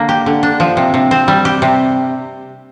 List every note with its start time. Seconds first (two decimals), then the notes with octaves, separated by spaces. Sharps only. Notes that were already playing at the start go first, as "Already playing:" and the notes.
Already playing: D3 A#3 D4
0.09 G4
0.26 D3
0.43 D4
0.60 F3
0.77 C3
0.94 C3
1.11 C4
1.28 G3
1.45 G4
1.62 C3